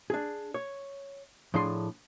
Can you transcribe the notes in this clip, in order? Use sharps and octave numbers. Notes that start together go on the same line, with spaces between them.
D4 G#4
C#5
A2 F3 D4 G#4 C6